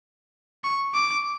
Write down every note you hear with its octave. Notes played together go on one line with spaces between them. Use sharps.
C#6
D6